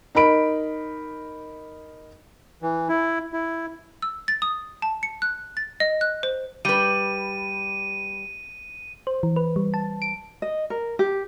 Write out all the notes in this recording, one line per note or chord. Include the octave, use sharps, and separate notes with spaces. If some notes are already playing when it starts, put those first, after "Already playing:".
D#4 A#4 B5 D7
E3
E4
E4
E6
A6
D#6
A5
C#7
F#6
A6
D#5
F#6
C5
G3 B4 D#7
C5
E3
B4
G3
A5
D7
D#5
A#4
G4